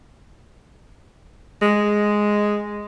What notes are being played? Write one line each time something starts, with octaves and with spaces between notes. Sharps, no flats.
G#3